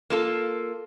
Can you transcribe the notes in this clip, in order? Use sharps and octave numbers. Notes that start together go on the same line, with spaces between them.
A#3 F4 A4